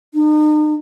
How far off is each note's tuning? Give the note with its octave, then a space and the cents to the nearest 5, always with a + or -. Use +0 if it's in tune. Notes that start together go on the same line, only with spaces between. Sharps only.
D#4 -40